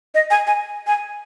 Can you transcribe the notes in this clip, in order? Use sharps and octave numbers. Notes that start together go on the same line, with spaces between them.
D#5
G#5
G#5
G#5